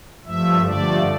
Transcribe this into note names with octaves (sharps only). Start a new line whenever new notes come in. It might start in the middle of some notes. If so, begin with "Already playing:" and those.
G2 F3 A3 E5
G2 D3 F3 A3 D5